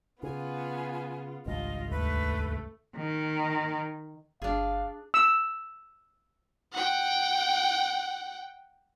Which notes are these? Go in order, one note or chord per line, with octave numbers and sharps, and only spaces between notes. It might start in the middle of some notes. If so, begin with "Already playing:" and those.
C#3 B3 F4 G#5
G#1 C#2 G2 F4 D#5
D#2 A3 B4
D#3
G1 D4 G#4 F5
E6
F#5 G5